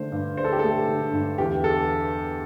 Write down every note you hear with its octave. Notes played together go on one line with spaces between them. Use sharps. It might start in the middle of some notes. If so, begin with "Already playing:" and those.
Already playing: D3 A3 D4 C5
G2
D4 C5
A4
G4
A3 A4
D3
G2
E2 G4
A4